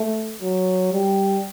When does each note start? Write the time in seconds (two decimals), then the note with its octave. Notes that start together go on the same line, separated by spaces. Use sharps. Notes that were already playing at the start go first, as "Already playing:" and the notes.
Already playing: A3
0.42 F#3
0.93 G3